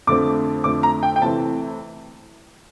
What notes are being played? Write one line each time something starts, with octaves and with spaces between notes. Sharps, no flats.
F2 D3 A3 C4 D6
F2 D3 A3 C4 D6
A#5
G5
G5
C3 E3 A3 C4 A5